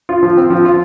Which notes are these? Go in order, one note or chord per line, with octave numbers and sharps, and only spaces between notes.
F4
F3
C4
F3
F4